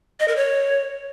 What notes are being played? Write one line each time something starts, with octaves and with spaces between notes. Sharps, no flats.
D#5
A#4
C#5